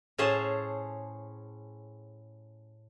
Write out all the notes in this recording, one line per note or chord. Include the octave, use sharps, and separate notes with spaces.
A2 C#4 G#4 C5 C#5 A5